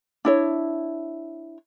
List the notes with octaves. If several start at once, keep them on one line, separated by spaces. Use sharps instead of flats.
D4 E4 C#5